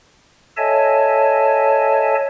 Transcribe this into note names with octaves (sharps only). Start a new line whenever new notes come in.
A4 C#5 D#5 E5 G#5 A5